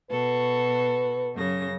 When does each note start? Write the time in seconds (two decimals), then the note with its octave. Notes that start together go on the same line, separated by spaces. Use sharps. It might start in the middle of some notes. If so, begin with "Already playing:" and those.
0.11 B2 F#4 A4 B4
1.34 F#2 C#3 A#6